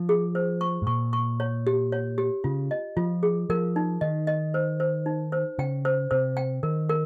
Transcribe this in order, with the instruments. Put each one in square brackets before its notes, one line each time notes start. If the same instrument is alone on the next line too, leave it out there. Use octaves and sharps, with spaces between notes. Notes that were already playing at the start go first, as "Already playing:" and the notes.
Already playing: [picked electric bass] F3
[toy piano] G#4
C5
C#6
[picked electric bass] G#2
[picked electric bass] A#2 [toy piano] C#6
[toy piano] C#6
C#5
G4
C#5
G4
[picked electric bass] C#3 [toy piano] F4
[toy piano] D#5
[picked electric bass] F3 [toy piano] F4
[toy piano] G#4
[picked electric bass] F3 [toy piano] A#4
[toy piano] D#4
[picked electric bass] D#3 [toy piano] D#5
[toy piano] D#5
C5
C5
D#4
C5
[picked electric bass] C#3 [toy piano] G5
[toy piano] C5
[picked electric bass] C3 [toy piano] C5
[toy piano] G5
[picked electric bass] D#3 [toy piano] A#4
[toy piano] A#4